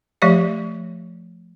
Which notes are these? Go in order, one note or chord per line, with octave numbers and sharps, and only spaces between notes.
F3 A3 G4 D5 F5